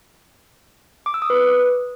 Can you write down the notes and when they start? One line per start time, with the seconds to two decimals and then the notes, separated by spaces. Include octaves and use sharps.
1.06 D6
1.14 E6
1.22 D#6
1.30 B4